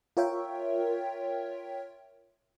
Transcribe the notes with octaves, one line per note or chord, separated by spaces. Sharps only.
F4 A#4 C#5 E5 G5